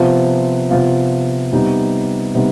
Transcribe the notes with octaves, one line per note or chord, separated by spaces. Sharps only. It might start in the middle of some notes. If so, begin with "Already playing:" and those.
Already playing: C3 F3 B3 F4
C3 F3 B3 F4
C3 G3 B3 D#4
C3 G3 B3 D#4